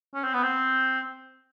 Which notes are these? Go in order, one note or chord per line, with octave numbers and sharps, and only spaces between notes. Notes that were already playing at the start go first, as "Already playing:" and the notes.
C#4
C4
B3
C4